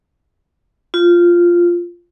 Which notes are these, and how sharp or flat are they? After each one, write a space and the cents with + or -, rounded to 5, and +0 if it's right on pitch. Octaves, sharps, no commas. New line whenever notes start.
F4 -5